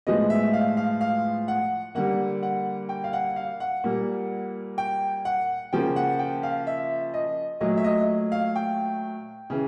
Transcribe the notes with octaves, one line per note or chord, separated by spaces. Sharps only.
A2 F3 G#3 B3 D#5
E5
F5
F5
F5
F#5
D3 G3 A#3 F#5
F#5
G5
F5
F#5
F5
F#5
A#2 G3 A#3
G5
F#5
C#3 F3 A#3 G5
F#5
G5
F5
E5
D#5
A#2 F#3 A3 D#5
E5
D#5
F5
G5
C#3 E3